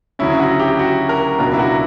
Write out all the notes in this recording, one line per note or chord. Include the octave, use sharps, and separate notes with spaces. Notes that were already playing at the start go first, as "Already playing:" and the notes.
D2 C#3 F#3 C#4 E4
F#4
G4
F#4
A#4
C#2 B2 F#3 B3 D4 A#4
E4
F#4